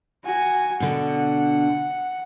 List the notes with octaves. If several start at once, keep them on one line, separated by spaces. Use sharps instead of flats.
F#4 G#5
B2 D3 F#5